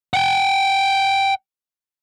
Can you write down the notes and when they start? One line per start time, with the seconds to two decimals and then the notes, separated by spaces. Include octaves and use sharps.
0.14 F#5 G5